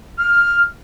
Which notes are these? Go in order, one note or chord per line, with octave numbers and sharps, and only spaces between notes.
F6